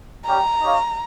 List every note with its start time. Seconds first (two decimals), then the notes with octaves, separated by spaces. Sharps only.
0.26 G3 C#4 G4 A#5
0.61 D#4 G4 C#5 F5